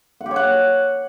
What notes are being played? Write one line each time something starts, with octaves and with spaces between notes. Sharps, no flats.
F#5
G4
C#5
F#5